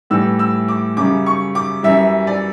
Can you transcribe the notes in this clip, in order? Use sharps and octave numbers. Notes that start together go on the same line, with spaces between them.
A2 E3 G3 E6
E6
D6
F#2 C#3 G3 D6
C#6
D6
F#2 E3 G3 E5
D5